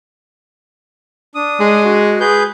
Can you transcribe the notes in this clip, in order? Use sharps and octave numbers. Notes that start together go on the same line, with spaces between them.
D4 D#6
G#3
F#4
G#4 B4 G6